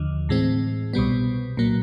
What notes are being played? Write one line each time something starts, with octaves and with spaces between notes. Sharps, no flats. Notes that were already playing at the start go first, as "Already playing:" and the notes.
Already playing: D#2 D3 F3
A2 E3 G#3 C4
C2 B2 G3 B3
A#2 F#3 A#3